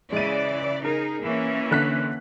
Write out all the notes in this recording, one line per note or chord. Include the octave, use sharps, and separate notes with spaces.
C#3 E3 G#3 D5 D#7
D#4 G#4 A#4
E3 A#3 C#4
D3 F#6 B6